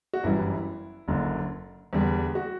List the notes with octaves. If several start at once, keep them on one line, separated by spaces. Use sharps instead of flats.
F#4
G1 F#2 E3 G3 E4
F#1 F#2 D3
E2 D3 G3
F#4